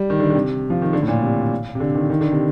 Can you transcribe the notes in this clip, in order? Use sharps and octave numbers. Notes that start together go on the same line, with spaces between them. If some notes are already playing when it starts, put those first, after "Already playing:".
Already playing: G3
D#3
D3
D3
C3
F3
D#3
D3
A2
A#2
C3
C3
D3
D#3
D#3
D3
C3